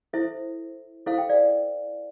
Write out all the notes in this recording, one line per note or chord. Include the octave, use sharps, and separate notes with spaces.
E4 A4 C5 E5
E4 A4 C5 F5
G5
D5 F5